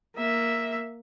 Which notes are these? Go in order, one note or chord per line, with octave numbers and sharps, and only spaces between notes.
A#3 E5